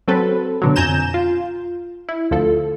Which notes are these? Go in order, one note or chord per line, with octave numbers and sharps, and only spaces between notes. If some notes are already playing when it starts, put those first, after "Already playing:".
F#3 C4 A4 B4
B2 D3 F#3
F2 G#5 A#5 G6 E7
F4
E4
D2 F3 A4